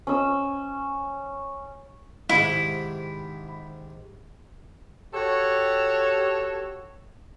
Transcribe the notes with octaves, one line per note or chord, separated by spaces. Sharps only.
C#4 E6
G#2 C3 D#3 E4
F#4 G4 A4 C#5